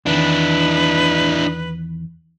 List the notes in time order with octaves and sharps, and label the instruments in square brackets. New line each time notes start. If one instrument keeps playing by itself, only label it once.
[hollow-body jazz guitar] E2 D#3 [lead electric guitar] D4 E4 [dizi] B4